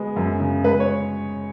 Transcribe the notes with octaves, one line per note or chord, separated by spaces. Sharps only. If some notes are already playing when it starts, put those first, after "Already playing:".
Already playing: G#3 B3
F#2
C#3
G#3 B4
C#5